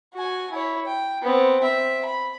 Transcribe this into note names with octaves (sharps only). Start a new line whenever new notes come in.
F#4 G#5
E4 C#5
G5
B3 C4
C4 E5
B5